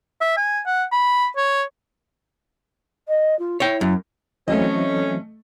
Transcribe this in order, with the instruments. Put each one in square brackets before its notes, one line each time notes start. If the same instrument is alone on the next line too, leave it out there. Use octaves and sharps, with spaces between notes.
[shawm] E5
G#5
F#5
B5
C#5
[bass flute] D#5
F4
[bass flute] E4 [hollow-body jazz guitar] C#5 G5
[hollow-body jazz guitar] F#2
[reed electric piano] E3 F#3 C4 [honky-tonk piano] A3 D#5 [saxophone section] C#4